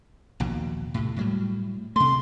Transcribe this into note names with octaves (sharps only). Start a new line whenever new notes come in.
A#1 D#2 B2
A2 C3
A2 F#3 G3
C3 A3 C6